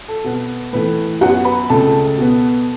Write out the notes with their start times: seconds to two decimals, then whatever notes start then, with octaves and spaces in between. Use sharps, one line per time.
0.08 A4
0.24 B2 B3
0.73 A2 E3 A3 B4
1.21 F#2 F#3 B3 F#4 F#5
1.45 B4 B5
1.70 C#2 C#3 A3 A4 A5
2.18 B2 B3